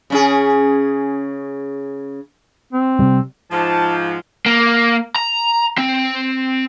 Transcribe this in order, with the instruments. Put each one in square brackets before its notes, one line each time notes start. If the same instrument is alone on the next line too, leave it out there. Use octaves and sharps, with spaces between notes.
[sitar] C#3 C#4 G#4
[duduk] C4
[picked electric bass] C3 G3
[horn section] G#2 F3 [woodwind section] A5
[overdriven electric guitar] A#3
A#5
C4